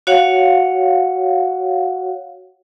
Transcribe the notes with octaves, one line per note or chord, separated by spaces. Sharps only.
F#4 C#5 F5 F#5